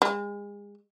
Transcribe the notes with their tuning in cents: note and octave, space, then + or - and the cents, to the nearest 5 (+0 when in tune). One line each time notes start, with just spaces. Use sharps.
G#3 -35